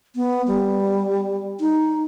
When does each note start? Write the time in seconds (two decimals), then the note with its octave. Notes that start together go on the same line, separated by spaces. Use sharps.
0.16 B3
0.48 G3
1.60 D#4